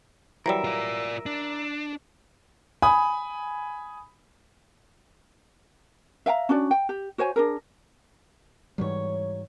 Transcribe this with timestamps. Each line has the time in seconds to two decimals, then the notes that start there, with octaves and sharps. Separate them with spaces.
0.46 E3 F#3 G3 A#4 E5
0.64 F4 D5
1.26 D4
2.82 G#5 B5 D#6
6.26 E5 F5 G5 A#5
6.49 C#4 D4 F#4 D5
6.71 G5
6.89 G4
7.18 F#4 C5 C#5 G#5
7.36 D4 G#4 A#4
8.78 G#2 E3 F#3 G3 C#5